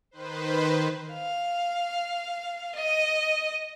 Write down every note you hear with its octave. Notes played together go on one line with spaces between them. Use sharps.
D#3 B4 C5
F5
D#5